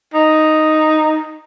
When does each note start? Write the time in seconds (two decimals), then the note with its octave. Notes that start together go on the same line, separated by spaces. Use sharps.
0.14 D#4